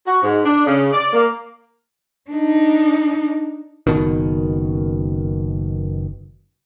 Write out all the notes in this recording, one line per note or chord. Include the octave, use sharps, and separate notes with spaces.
F#4
G#2
D4
C#3
D5
A#3
D4 D#4
F#1 B2 D#3